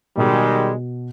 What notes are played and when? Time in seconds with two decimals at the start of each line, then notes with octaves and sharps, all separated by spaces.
0.17 B2 D#3 G3 G#3